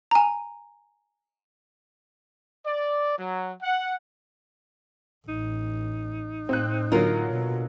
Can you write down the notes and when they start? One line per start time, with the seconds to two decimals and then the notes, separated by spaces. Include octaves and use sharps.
0.11 G#5 A#5
2.65 D5
3.18 F#3
3.62 F#5
5.28 A1 D#4
6.49 A2 C4 F#6
6.92 D3 F#3 A#3 F4 A#4
7.30 B2